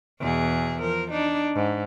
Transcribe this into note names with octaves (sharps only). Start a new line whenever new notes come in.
E2 B2 G#4
F3 A#4
D4 D#4
G#2